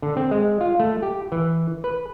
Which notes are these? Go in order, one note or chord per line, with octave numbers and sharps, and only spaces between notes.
D3
C4
G#3
F4
A3
G4
E3
B4